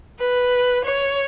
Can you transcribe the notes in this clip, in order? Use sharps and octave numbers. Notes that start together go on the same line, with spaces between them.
B4
C#5